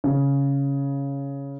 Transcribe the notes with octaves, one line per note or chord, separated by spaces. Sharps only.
C#3